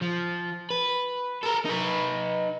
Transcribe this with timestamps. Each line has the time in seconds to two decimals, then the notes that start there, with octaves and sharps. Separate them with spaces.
0.01 F3
0.70 B4
1.44 A4 A#4
1.66 D#4 B4